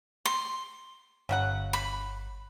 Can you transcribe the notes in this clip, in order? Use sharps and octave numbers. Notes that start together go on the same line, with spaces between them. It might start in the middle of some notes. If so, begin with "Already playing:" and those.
C6
G1 C#3 F#3 F#5 F#6
B5